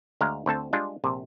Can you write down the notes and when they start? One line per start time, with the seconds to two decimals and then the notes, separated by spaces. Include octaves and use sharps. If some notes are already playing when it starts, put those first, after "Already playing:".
0.21 D2 G#3 F5 A#5
0.46 D2 C4 A4 A5
0.73 G3 G#3 D4 F4
1.04 A#1 C3